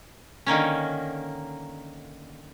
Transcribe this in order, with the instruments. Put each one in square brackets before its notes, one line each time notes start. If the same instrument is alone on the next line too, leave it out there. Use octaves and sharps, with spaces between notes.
[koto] D3 D#3 A#3 C#4